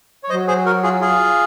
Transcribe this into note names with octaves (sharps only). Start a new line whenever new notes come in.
C#5
F#3 C5 D#5
G#4 C5
F#4 A#4
F4 G#4
F4 G#4